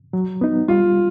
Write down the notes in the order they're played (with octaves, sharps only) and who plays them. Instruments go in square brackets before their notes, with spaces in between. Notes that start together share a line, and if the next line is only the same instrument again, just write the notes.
[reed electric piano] F#3
B3 D#4
[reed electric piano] G3 [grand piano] F4